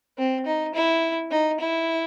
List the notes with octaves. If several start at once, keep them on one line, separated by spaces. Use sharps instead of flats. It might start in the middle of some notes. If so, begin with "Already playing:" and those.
C4
D#4
E4
D#4
E4